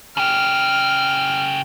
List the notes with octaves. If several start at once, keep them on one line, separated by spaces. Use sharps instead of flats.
C#3 G4 F6